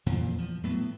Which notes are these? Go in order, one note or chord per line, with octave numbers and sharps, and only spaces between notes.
F2 A#2 E3 F3
E2 F3
A2 F#3 B3